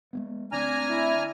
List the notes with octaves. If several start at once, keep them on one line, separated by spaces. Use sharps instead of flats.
G#3 A#3 B3
D2 B3 C4 D4 G#5 A#5 F6
E4